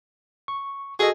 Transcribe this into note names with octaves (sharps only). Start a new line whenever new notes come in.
C#6
F#4 G#4 A4 D#5